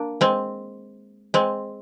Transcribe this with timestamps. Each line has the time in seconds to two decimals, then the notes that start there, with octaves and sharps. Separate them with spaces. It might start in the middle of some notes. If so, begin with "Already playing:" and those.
Already playing: A#3 D4
0.21 G#3 C4
1.34 G#3 C4